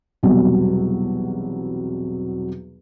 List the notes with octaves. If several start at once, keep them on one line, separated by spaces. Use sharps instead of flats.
B1 E2 C3 F#3 G3